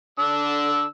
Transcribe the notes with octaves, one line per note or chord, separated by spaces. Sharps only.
D3 D4 E6